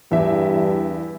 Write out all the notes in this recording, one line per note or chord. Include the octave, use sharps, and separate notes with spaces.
E2 G2 E5